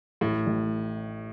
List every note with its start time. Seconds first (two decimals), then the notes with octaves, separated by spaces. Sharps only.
0.21 A1 A2
0.47 A1